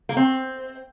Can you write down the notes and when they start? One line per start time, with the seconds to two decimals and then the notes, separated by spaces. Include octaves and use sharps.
0.09 A#3
0.17 C4